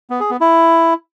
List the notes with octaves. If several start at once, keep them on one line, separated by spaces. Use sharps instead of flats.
B3
G#4
B3
E4